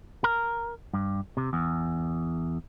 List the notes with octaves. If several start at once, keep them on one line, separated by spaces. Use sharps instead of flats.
A#4
G2
C3
E2